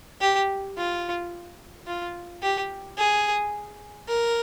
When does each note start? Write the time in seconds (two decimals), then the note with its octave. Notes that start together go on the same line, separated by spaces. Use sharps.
0.21 G4
0.77 F4
1.87 F4
2.43 G4
2.98 G#4
4.08 A#4